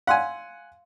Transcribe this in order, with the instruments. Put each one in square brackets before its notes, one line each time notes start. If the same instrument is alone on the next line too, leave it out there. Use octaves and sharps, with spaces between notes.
[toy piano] F5 C6 E6 [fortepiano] F#5 G#5